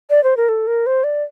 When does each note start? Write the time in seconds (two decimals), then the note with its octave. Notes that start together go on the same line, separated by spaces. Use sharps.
0.10 D5
0.24 C5
0.37 A#4
0.49 A4
0.67 A#4
0.86 C5
1.04 D5